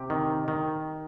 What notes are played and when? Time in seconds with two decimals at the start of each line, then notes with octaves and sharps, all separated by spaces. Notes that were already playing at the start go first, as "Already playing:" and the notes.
Already playing: C3 G4
0.10 D#3
0.48 D#3